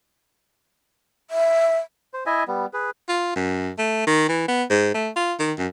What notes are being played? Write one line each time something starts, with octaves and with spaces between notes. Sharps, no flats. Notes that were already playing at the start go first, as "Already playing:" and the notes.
E5
C5
E4 D#5 E5 G#5
G3 B3
G#4 B4
F4
F#2
A3
D#3
E3
B3
G#2
A3
F4
D#3
F#2